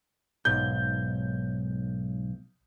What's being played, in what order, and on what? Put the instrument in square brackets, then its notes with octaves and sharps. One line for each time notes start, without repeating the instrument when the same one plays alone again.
[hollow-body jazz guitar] B1 G#2 [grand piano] G6